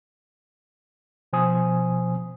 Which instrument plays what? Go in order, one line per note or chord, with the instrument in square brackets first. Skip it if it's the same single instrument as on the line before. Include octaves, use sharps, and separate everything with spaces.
[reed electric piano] B2 F3 C5 G#5 D#6